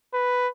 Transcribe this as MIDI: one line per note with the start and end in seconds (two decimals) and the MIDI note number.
0.14 0.48 71